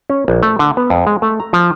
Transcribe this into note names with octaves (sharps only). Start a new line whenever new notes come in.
C#4
A#1
A3
D3
B3
F2
G#3
A3
A#5
F3